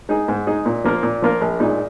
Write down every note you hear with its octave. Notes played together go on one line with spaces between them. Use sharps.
G#3 D#4 G#4
G#2
G#3 D#4 G#4
A#2
F3 A#3 F4 A#4
A#2
F3 A#3 F4 A#4
A#1
A#2 G#3 D#4